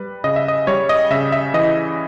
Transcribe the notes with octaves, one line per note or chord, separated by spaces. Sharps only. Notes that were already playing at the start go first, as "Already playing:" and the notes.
Already playing: G3 B4
C#3 D#5
E5
D#5
G3 C#5
D#5
C#3 E5
E5
E3 D#5